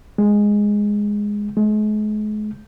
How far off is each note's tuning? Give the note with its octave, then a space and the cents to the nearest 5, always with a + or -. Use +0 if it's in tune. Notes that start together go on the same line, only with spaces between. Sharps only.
G#3 -5
G#3 +40